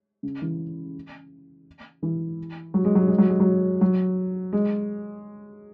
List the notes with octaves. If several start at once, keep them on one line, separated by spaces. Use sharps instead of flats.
C#3
E3
E3
F#3
G#3
F#3
G#3
F#3
G#3
F#3
F#3
G#3